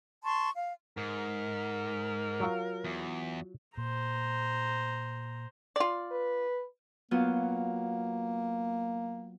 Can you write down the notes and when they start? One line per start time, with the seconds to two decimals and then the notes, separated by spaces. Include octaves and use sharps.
0.24 A5 C6 C#6
0.56 F5
0.97 G#2 A#4
2.40 F#3 F4
2.85 E2
3.77 A#2 C5 A#5
5.76 F4 D5
6.11 B4
7.11 F#3 A#3 B3 F4